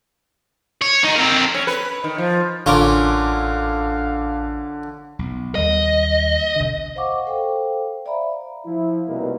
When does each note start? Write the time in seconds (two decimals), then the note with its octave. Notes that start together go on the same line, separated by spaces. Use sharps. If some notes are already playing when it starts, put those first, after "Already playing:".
0.82 C#5
1.04 D#3 D#4
1.16 C4 A#4
1.55 C#4
1.67 B4
2.04 D#3
2.18 F3
2.66 A1 D3 C#4 F4 A#4 F5 D6
5.19 B1
5.55 D#2 G3 D#5
6.56 B1 D3
6.96 C5 D#5 F5 F#5 C#6 D6
7.27 A4 C5 F5 G5
8.05 C5 D5 E5 F5 A#5 B5
8.66 F3 E4
9.08 C2 B2 A#3 D#4 B4